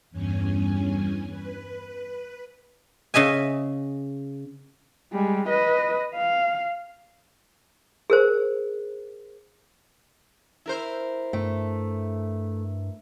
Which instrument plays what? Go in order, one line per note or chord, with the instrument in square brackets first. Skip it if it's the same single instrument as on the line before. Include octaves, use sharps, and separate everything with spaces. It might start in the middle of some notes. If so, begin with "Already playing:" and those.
[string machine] E2 G2 C#4 G#5
B4
[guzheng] C#3 D#5 E5 G#5
[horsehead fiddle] G3 G#3
B4 D#5
F5
[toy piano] G#4 A#4 C5
[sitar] E4 A#4 C5
[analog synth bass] G2 [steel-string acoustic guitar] A3